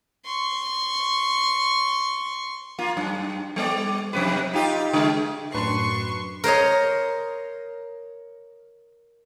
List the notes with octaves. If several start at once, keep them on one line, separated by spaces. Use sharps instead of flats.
C6 C#6
A#3 F4
F#2
G3 B3 D5
F2 C3 B4
D#4 F4 G4
C#3 G#3
F#2 A2 D4 B4 C6 C#6
A#4 C5 C#5 D#5